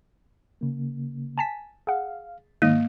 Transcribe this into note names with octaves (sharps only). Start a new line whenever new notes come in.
C#3 A#3
G#5 A5 B6
G#4 F5 F#5
G#2 D#3 A#3 D#5